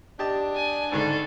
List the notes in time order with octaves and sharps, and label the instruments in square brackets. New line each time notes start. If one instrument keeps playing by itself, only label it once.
[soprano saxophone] D4 [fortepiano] G4 D#5 A5
[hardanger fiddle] G#5
[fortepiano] G#1 G#2 D3 [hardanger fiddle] A4 D5